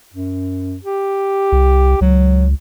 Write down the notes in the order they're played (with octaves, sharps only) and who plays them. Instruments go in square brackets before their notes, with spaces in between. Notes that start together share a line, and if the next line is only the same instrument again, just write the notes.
[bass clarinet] F#2
G4
[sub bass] C2
[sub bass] C#2 [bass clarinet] F#3